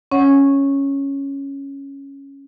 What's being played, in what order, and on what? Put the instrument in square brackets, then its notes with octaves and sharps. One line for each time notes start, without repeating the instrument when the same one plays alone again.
[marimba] C#4 C#5 F#5